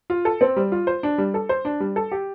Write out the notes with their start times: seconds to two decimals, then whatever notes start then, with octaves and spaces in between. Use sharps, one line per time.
0.10 F4
0.25 A4
0.41 C4
0.56 G3
0.72 F4
0.87 C5
1.03 D4
1.18 G3
1.34 A4
1.49 C5
1.65 D4
1.80 G3
1.96 A4
2.11 G4